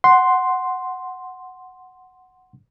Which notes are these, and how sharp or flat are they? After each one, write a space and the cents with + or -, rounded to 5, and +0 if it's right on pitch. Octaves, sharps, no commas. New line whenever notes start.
F#5 +0 C6 +0